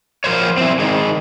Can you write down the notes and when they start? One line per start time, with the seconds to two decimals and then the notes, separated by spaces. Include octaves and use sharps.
0.24 F3 A#4 C5 C#5
0.58 C4 E4
0.79 D#3 G#3